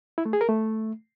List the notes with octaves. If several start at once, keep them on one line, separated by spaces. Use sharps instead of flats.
E4
A3
G#4
A#4
A3